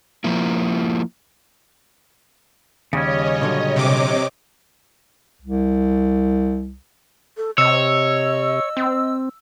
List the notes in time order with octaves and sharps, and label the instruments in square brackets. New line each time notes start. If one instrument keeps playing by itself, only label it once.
[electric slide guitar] F3 A#3 E4
[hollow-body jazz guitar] D#2 [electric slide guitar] C#3 G3 C#4 [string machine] C#5 D#5
[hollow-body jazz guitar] A#2 D3 F#3
[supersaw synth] C3 D6
[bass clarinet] C2
[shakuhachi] A4
[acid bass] C3 [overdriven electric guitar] C#5 [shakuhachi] D#5 [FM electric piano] E6
[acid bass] C4